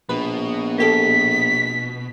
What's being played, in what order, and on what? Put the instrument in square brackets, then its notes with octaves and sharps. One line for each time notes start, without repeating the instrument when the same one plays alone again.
[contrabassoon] A#1 [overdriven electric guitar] B2 [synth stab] B4
[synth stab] A#3 G4 A4 [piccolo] B6